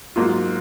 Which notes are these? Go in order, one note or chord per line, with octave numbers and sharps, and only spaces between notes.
G#2 F#3 A#3 F4